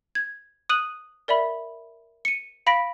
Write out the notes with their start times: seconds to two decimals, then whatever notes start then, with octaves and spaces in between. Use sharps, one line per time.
0.15 G#6
0.69 D#6 F#6 D#7 F#7
1.28 A#4 D5 E5 B5
2.25 C#7 D#7
2.67 F5 B5 A#6 B6 D7